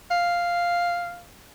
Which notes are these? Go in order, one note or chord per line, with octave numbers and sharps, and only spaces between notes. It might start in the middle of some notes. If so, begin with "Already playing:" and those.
F5